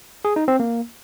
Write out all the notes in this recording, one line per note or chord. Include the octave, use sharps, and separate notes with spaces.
G#4
D#4
C4
A#3